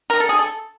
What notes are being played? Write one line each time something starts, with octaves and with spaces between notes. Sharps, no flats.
A#4
A4
G#4
A4